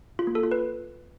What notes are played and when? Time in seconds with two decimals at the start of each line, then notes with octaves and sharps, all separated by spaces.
0.19 F4
0.27 A#3
0.35 A4
0.43 F4
0.52 B4